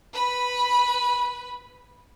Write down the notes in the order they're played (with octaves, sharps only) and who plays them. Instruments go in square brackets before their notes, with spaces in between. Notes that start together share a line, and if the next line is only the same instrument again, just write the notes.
[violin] B4 B5